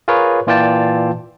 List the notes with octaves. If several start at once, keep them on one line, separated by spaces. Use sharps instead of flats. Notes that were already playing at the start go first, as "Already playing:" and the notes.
F4 G#4 A#4 B4 C#5
A#2 E3 F4 D5 G5 A5